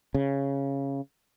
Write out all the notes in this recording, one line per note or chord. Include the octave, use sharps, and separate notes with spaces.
C#3